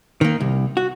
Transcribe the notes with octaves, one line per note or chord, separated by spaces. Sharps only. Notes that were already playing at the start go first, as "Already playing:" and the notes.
D#3 A#3
C2
F#4